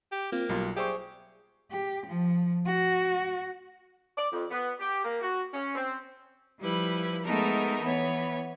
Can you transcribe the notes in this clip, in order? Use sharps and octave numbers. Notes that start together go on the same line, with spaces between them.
G4
A#3 C4 F4
B1 F#3 G3 F4 A#5
G4 G#4 C5 D5 E5 C#6 E6
G4
F3
F#4
D5
F2
B3
G4
A#3
F#4
C#4
C4
F3 G3 E4 B4
G#3 A3 B3 D#4 A4 A#4
E3 B3 C#5